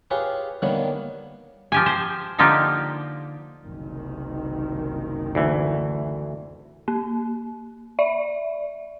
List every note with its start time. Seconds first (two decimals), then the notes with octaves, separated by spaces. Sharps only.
0.11 F4 G4 G#4 B4 C#5
0.62 D3 D#3 G3 A#3 B3 C#5
1.72 F3 G4 G#5
1.86 C5
2.38 D3 F3 A#3 D#4 F4 G4
3.64 F#1 C2 D#3
5.35 D2 E3
6.88 A#3
7.99 D5 E5